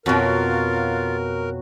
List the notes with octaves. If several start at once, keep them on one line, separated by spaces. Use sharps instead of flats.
F2 B2 F#3 F4 F#4 A#4